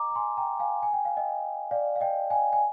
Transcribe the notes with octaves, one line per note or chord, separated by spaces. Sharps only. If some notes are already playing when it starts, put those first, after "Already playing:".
Already playing: D#5 G5 A#5 D6
A#5
G#5 C6
G5 A#5
F5 G#5
G#5
G5
F5
D#5 G5
D5 F5
F5
D#5 G5
F5 G#5
G#5